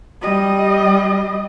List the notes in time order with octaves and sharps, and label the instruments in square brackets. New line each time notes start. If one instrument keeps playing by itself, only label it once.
[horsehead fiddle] G3 D#5